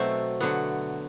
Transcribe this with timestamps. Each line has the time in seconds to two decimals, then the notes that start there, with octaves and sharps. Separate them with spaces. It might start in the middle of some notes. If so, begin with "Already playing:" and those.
Already playing: B2 F#3 A3 C4 E5
0.41 D3 F#3 B3